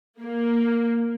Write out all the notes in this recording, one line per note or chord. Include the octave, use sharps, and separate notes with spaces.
A#3